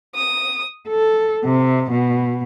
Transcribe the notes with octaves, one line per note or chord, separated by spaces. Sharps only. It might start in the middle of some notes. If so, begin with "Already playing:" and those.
D#6
A4
C3
B2